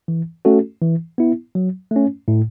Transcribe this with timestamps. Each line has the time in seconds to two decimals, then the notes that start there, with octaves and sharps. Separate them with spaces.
0.08 E3
0.45 A3 C#4 F#4 A4
0.82 E3
1.18 B3 E4
1.55 F#3
1.91 A3 C#4
2.28 A2